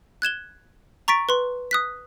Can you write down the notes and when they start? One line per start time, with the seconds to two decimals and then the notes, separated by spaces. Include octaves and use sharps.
0.22 F#6 G#6 E7 G7
1.08 A#5 C#6 A6 B6 D7
1.29 B4 C6
1.71 D#6 F#6 B6